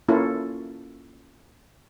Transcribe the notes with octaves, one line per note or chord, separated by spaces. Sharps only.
A#3 C#4 E4 F4 A4